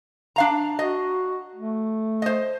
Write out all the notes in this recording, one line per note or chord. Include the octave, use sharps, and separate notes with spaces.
D4 F5 A#5
F#4 D#5
A3
C5 D#5